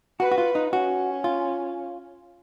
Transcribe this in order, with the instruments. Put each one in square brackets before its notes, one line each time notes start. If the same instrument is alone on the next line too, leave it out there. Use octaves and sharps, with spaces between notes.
[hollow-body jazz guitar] F#4 [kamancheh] B4
[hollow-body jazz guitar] F#4
F4
D#4
[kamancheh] C#4 [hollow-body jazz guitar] F#4
[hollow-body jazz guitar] F4